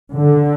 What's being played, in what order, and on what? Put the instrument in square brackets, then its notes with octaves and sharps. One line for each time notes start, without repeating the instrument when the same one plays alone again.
[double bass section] D3